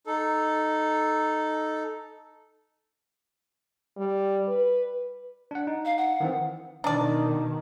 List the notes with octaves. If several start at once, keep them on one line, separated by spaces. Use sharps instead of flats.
D#4 A4
G3
B4
D4 F#5
D#4
F5
F#5
D#3 E3 C4
B2 D#3 D4 D5